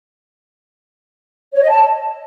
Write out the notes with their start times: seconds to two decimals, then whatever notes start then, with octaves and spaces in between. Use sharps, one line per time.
1.54 C#5
1.62 D#5
1.69 A5